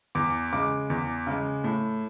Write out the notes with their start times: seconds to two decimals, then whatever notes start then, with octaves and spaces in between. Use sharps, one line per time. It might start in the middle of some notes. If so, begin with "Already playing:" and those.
0.15 E2 D6
0.52 C#3 G#3 D6
0.90 E2
1.27 C#3 G#3
1.64 A2